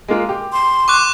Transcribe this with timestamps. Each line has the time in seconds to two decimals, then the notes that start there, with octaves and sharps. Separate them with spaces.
0.08 G#3 A#3 F4
0.29 G4
0.53 C6
0.88 C#6 D6 F#6